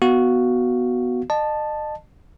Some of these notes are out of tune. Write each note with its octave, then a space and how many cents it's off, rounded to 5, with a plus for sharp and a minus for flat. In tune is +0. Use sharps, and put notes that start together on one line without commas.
B3 +0 F#4 +0 F5 +0
D#5 -35 A5 +0